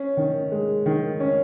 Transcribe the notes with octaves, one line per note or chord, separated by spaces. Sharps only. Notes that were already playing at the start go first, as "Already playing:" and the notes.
Already playing: C#4
D#3
G#3
D#3
C#4